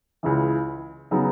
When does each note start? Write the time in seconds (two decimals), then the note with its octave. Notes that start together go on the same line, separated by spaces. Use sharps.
0.23 C#2 C#3 E3
1.11 C#3 F#3 B3 D#4